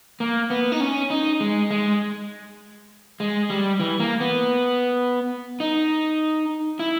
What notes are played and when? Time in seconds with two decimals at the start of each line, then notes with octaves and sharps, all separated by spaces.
0.20 A#3
0.50 B3
0.72 D#4
0.80 C#4
1.10 D#4
1.40 G#3
1.71 G#3
3.20 G#3
3.50 G3
3.80 E3
4.00 A#3
4.20 B3
5.60 D#4
6.79 E4